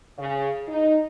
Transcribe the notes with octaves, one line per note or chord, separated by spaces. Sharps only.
C#3
D#4